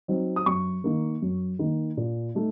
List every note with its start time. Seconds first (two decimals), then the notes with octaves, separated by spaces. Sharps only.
0.08 F#3 C4 D#4
0.36 D#6
0.46 F#2 C#6
0.84 D#3 A#3
1.22 F#2
1.59 D#3 A#3
1.97 A#2
2.35 A3 D#4